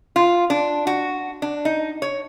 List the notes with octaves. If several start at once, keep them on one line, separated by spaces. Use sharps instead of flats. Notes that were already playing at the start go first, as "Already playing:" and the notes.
F4
D4
F#4
D4
D#4
C#5